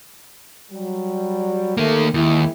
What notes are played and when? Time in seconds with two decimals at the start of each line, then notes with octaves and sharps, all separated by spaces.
0.71 F#3 G3
1.77 D#3 A3 A#3
2.14 D#2 G#3 A#3 E4